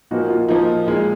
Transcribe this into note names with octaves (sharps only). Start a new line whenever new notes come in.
A#2 F3 A#3 D#4 F#4
F4
A#2 F3 A#3 D#4
A#2 G#3 D#4